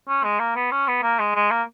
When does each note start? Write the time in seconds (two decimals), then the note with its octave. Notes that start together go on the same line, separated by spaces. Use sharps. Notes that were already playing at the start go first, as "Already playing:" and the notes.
0.08 C#4
0.24 G#3
0.40 A#3
0.56 B3
0.72 C#4
0.88 B3
1.03 A#3
1.19 G#3
1.35 G#3
1.51 A#3